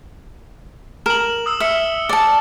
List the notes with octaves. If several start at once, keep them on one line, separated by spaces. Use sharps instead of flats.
A#4 E7 F#7
D#6 E6
E5 F6 C#7
D5 A5